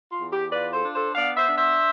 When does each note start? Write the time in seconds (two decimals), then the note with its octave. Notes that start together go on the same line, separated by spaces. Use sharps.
0.10 F4
0.21 E2
0.31 G4
0.52 F4 B4 D5
0.73 A4 C5
0.84 D4
0.94 A4 C5
1.15 B3 D5 F5
1.36 C5 E5
1.47 D4
1.58 C5 E5